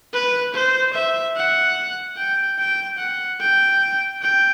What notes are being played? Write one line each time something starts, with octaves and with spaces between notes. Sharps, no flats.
B4
C5
E5
F#5
G5
G5
F#5
G5
G5